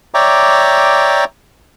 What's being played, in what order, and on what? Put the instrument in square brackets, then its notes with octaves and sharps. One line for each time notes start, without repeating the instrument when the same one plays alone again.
[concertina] C#5 D5 E5 G5 A#5 D6